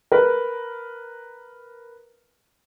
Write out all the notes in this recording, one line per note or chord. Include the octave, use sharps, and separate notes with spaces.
A#4 B4